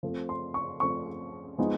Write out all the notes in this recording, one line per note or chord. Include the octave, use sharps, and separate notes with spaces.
F3 A3 C4
C6
C#6
F3 A3 C4 C#6
F3 G#3 B3 D#4